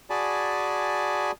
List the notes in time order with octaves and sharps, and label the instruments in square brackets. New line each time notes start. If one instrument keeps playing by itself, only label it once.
[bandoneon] F#4 G#4 D5 G#5 A5 B5